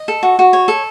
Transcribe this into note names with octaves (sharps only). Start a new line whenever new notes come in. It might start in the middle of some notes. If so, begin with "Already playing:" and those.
Already playing: D#5
A4
F#4
F#4
C#5
A4